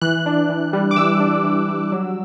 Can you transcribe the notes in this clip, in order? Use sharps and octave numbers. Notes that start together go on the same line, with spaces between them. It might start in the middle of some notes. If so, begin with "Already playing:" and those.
E3 F#6
D4
E3
G3
D6
E3 E6
D4
E3
G3
F#3